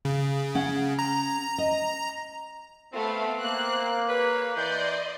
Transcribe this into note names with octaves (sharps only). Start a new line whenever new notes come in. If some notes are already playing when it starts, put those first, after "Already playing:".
C#3
C#4 F#5
A#5
D#5
A3 B3 C4 F5
A#3 F#6
B4 C#5
E3 D5 D#5 C6 G6